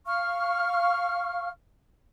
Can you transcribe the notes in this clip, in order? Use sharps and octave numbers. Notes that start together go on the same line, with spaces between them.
F5 C#6 F6